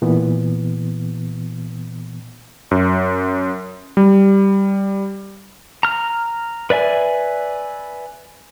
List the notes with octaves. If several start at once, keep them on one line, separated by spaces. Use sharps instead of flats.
A#2 E3 B3
F#2
G3
A#5 F6
B4 D5 E5 G#5